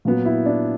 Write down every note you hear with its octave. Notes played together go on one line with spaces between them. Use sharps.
A#2 F#3 B3
E4
D4